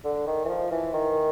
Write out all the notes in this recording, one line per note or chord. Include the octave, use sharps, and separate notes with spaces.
D3
D#3
E3
F3
E3
D#3